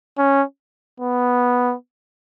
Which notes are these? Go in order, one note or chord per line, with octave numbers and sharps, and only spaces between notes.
C#4
B3